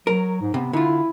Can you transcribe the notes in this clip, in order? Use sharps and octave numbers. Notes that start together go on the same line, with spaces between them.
F#3 A#4
G#2
C3 B3
D3 E4 F4